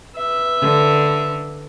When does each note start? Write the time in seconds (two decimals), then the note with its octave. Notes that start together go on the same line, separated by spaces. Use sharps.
0.16 B4 E5
0.61 D3